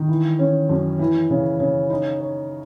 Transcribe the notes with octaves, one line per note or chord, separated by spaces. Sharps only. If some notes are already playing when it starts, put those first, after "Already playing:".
Already playing: D#3
E3
C#4
F#2
E3
C#3
C#3
D#4
C#5